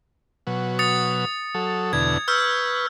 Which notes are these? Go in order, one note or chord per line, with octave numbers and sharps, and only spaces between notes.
B2 F#3
D#6 A6 C#7
F#3 A4
E2 B2 D3 G#6
B4 C#6 E6 F6 G6